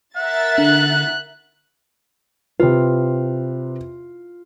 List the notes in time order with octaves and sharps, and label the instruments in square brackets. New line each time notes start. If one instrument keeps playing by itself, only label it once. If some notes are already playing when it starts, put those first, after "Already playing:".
[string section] A#4 E5 A6 [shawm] F#5
[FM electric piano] D3 [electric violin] F#6
[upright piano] C3 B4 [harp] F4